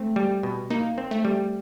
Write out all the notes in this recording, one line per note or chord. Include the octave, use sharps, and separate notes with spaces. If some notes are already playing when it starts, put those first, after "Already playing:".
Already playing: A3 C4
G3
B2
A#3 D#4
C4
A3
G3